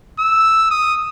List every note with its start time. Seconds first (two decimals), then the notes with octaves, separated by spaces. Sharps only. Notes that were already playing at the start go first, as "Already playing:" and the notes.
0.19 E6
0.71 D#6